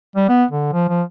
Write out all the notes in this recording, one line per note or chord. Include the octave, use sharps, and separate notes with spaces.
G3
B3
D3
F3
F3